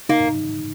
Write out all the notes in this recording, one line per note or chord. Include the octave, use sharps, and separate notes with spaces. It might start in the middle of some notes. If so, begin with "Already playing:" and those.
A#3 D#4